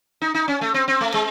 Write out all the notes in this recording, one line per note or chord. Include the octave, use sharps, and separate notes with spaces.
D#4
D#4
C#4
A3
C4
C4
A3
G#3